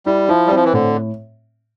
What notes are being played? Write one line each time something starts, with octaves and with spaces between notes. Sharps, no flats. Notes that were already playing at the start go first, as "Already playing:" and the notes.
G3 E4
F3 E4
G3 C4
F3
E3
A2 D3